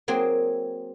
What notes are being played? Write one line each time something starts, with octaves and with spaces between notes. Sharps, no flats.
F#3 A#3 C4 G#4